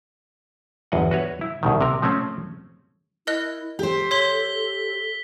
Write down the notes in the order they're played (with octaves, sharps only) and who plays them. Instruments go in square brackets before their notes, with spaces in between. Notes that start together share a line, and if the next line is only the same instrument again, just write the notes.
[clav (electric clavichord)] G1 E2 D#5 F#5
F#4 B4 C#5
E4
C2 B2 D#3
C3 A#4
F3 A3 C4 C#4
[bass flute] E4 [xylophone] A#4 D#5 F#6
[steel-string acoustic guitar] G4 C5 [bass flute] A4
[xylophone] C#5 C6 [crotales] B6 G7